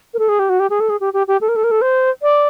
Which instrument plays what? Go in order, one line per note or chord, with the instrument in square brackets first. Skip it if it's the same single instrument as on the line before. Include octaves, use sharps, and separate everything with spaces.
[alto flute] A#4
A4
G#4
G4
F#4
G4
G#4
A4
G#4
G4
G4
G4
A4
A#4
A4
A#4
A4
C5
D5